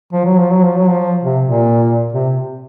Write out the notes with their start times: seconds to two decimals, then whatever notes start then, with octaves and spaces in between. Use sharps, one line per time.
0.13 F3
0.25 F#3
0.38 F3
0.51 F#3
0.63 F3
0.77 F#3
0.90 F3
1.23 C3
1.45 A#2
2.12 C3